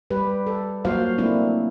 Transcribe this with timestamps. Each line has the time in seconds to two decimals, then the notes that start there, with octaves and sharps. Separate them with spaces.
0.11 G3 G4 B4
0.47 A4
0.85 F#3 A#3 F4 F#4 C5 F5
1.18 F#3 A3 A#3 C4 D4 E4